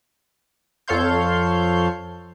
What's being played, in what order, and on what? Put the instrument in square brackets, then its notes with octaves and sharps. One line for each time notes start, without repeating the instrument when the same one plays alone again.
[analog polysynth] F2 A4 C#5 F5 C6 G6